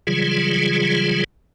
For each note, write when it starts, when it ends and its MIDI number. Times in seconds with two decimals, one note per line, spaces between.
0.07 1.24 49
0.07 1.24 52
0.07 1.24 54
0.07 1.24 55
0.07 1.24 65
0.07 1.24 68